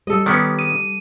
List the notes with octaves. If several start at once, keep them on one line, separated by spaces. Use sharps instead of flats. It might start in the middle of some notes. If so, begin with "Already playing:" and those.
G3 A4 D#5
D#3 B3 C#4 D5
D#7